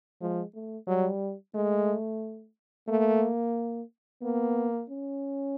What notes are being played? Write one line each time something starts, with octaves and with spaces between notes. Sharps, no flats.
F3 G#3
A3
F#3 G3
G#3 A3
A3 A#3
A#3 B3
C#4